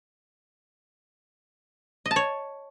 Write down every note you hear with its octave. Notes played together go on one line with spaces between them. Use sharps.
D#5
A5
C#5